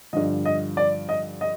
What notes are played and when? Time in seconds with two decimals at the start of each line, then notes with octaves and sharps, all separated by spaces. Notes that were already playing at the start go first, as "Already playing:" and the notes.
0.13 G2 D3 F3 D#5
0.45 D#5
0.77 D5
1.09 D#5
1.41 D#5